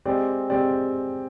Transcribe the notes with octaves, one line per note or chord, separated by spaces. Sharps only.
G#3 C4 G4 D5
G#3 C4 G4 D5